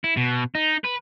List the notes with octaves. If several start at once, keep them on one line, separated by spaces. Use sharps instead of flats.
E4
B2
D#4
B4